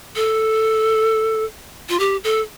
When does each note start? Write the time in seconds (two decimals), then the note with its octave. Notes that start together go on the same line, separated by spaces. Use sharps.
0.16 A4
1.89 F4
2.00 G4
2.24 A4